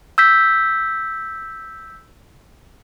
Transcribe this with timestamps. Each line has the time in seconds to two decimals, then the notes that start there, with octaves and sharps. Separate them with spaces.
0.18 E6 G6 B6